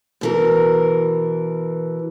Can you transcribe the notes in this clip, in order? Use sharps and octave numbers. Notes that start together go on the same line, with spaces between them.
B2 E3 A#4